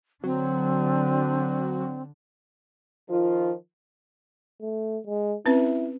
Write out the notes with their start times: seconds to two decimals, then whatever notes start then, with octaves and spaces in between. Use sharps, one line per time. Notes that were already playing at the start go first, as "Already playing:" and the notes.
0.24 D3 F#3 C4 D4
3.09 D#3 F3 F4
4.62 A3
5.06 G#3
5.46 C4 C#4 E4 B4